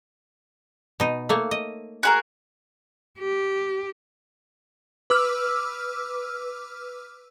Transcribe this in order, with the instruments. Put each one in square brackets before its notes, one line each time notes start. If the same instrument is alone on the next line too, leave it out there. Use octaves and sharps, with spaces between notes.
[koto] B2 D#4
A3 A#3 C#5
D#5
[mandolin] F#4 G#4 A#4
[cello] G4
[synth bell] B4 D6 E6 F6